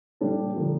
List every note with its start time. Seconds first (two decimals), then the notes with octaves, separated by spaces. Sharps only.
0.21 A#2 G3 D4 A4
0.56 D3 F3 A#3